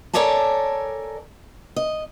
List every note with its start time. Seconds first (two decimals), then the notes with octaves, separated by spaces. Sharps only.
0.13 A4 A#4 C#5 D5 G#5 A5
1.76 D#5